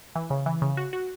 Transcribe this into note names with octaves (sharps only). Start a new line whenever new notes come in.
E3
C#3
E3
C#3
F#4
F#4